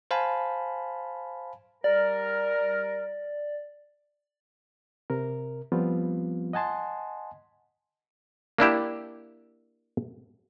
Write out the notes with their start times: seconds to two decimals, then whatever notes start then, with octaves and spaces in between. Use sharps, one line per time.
0.11 C5 F5 G#5 A5 B5
1.84 G3 A#4 D5
5.10 C3 A#4
5.72 F3 G3 B3 C4 F4
6.53 D#5 F#5 G#5 A5 C6
8.58 A#3 D4 E4 G4